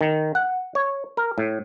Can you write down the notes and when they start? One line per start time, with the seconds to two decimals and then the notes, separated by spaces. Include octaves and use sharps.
0.01 D#3
0.35 F#5
0.75 C#5
1.17 A#4
1.38 A2